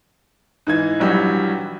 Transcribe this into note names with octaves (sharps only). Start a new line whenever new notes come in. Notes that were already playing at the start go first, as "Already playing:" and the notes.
G#2 E3 G#6
A#1 E3 F#3 G3